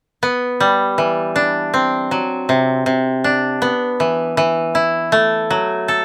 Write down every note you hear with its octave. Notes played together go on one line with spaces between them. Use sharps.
B3
G3
E3
D4
C4
F#3
C3
C3
D4
B3
E3
E3
E4
A3
F#3
A4